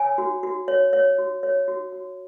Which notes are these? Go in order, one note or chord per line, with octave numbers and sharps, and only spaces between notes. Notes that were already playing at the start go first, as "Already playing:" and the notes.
Already playing: C#5 G#5
F#4
F#4
C#5
C#5
F#4
C#5
F#4
F#4